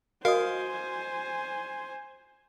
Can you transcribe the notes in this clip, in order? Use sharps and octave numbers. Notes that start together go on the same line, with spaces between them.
F#4 A#4 C5 D#5 F5 G#5 D#6